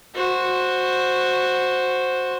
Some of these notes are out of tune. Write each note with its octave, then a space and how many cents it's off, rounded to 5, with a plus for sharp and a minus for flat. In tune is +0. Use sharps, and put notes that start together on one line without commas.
F#4 -10 C5 +0